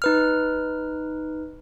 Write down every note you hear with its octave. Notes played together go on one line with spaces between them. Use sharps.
D#4 B4 F6